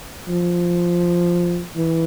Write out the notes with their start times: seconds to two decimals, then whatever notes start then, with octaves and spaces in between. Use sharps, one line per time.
0.29 F3
1.76 E3